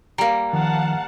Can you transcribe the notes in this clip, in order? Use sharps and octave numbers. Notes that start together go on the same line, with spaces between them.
G3 A#3 A#5
D#3 F3 F5 F#5 A5